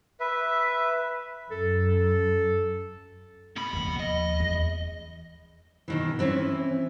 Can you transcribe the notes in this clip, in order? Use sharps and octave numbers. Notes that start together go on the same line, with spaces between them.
B4 E5
F#2 A4
B2 B5
D#2 F3
D#5
E2
B2 D#3 E3
E3 C4 C#4 E4